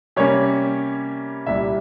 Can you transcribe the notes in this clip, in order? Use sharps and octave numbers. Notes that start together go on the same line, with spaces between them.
C3 G3 A#3 C#4 C#5
C2 A#2 G3 E5